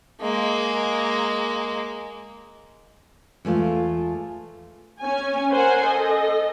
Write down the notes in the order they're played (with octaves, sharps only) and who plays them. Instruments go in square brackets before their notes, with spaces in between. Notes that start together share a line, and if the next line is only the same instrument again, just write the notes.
[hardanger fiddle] G#3 A#3
[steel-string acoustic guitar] E2 G#3 A3 F4
[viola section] C#4 G#5
A#4 C5 F#5 G#5
A4 D#5